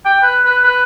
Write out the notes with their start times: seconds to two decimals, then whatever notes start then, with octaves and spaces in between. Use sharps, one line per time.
0.05 G5
0.22 B4
0.45 B4
0.64 B4